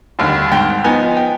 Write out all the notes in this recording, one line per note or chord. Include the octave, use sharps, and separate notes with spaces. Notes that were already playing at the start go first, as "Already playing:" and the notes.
D#2 D3 G3
G#2 G5
F3 B3 D#4 G#5
G5